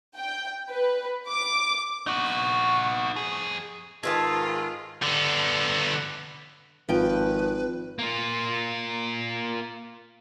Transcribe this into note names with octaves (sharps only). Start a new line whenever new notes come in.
G5
B4
D6
D#4 F#4
C#6
F2 G#4
G#2 D#3 F4 G#4 A4 B4 D#5 A5
D3 B3
G#1 F3 B4 G5
A#3 F4